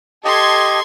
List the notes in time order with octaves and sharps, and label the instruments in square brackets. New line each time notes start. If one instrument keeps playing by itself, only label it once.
[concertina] G4 D#5 [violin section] A4 C6 G#6